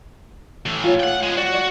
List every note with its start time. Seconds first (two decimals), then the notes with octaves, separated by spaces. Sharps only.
0.66 A2 E3
0.84 F4 C#5
1.00 F#5 G5
1.23 G#3 B3
1.37 F#4 D5 G5
1.54 D5